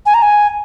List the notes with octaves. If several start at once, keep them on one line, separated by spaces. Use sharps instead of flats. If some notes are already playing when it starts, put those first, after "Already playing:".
G#5
A#5
G#5